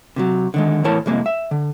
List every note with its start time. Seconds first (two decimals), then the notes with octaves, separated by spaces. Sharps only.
0.16 C3 D#3 F#3
0.54 D3 D#3 G#3
0.84 A2 E3 E4 A#4 C#5 A5
1.06 C2 F2 G#3 A#3
1.26 E5
1.51 D3